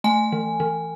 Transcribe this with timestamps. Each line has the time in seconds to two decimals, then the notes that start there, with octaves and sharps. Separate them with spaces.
0.04 A3 G#5
0.32 E3
0.60 E3